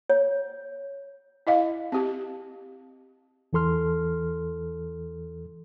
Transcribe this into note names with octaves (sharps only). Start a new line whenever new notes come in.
C#5
E4 D#5 F5
C4 G4
E2 E3 A4 C6 F6